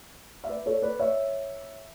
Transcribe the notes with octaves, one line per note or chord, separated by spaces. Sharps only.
E5
B4 D5
A4 C#5
B4 D5
C#5 E5